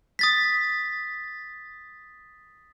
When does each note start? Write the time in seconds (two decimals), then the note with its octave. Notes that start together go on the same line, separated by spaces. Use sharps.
0.19 D#6 A6 B6